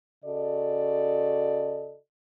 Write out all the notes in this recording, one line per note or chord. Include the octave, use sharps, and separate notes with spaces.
C#3 F#4 A4 D5 D#5